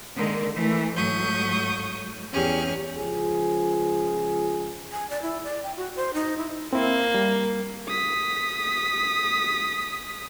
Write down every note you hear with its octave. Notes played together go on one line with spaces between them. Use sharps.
D3 D#3 G#3 A#3
E3 A3
G#2 F#3 A3 C#6 D#6 G6
E2 C#4 G4 G#4 F6
C#2 F3 G#4
G#5
D5
E4
D5
G5
F#4
C5
D#4
E4
A#3 C4 E4
G3
D#6 B6